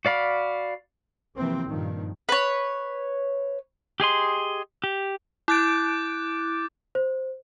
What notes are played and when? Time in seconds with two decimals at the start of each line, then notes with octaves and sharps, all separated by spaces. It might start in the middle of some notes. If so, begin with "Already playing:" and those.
0.05 F#4 D5 F5 B5
1.36 C3 E3 F3 A#3 C4
1.68 G2 A#2 D#3 F3
2.29 B4 C#5
4.00 G4 G#4 D#5 C6
4.84 G4
5.48 E4 D6 F#6 G6 A6 D7
6.95 C5